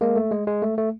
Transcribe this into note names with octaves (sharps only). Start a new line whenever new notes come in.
G#3 A#3
A3
G#3
G#3
A3
A3